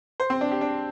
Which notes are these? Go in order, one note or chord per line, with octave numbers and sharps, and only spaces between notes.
C5
C4
D4
G4
D4